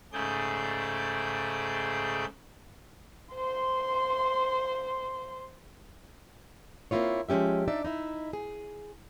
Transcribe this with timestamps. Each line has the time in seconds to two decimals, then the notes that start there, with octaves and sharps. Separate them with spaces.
0.13 G#2 C#3 A3 G#4 D5 G6
3.34 C5 C6
6.91 A#3 C4 E4 F4 C#5
7.29 F3 G#3 C#4 G4 E5
7.68 D4 D#4 D5 E5
7.85 D#4 E4 E5
8.33 G#4